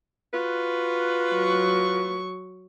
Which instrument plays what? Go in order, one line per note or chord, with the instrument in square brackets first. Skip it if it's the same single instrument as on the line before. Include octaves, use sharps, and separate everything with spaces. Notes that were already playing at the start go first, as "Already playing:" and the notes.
[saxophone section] F4 F#4 B4
[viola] F#3 C#6